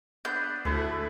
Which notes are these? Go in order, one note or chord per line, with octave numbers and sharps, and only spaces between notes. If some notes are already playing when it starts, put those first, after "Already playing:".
B3 D4 B4 G6
D2 A3 E4 G#4 A4 B4